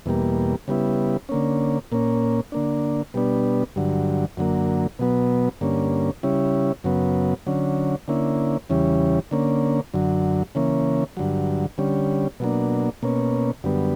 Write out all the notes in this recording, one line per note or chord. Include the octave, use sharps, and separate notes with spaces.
E2 B2 G3 A#3
C#3 G3 B3 E4
D3 A#3 C#4
A#2 A#3 C#4
D3 A#3 D4
B2 G3 B3 D4
G2 D3 F#3
F#2 D3 F#3 A#3
B2 F#3 B3
G2 D3 A#3 C#4
C#3 G3 C#4 E4
F#2 C#3 F#3 B3
D3 F#3 C#4
D3 A#3 C#4 E4
E2 C#3 E3 G3 C#4
D3 A#3 C#4
F#2 D3 F#3
C#3 E3 A#3 C#4
G2 D3 F#3
D3 G3 C#4
B2 F#3 A#3 D4
B2 A#3 C#4
F#2 D3 G3 B3